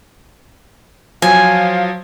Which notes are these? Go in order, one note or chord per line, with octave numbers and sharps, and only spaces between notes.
F3 F#3 F5 G#5